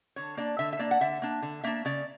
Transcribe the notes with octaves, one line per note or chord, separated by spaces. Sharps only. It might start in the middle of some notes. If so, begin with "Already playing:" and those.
D3 C#5
A#3 D4 D5
D3 E5
E5
A#3 D4 D5
F#5
D3 E5
A#3 D4
D3
A#3 D4 E5
C#3 D5